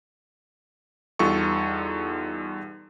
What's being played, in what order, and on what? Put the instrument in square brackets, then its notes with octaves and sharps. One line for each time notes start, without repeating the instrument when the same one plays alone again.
[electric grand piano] E2 G3 D#4 F4 A4 C#6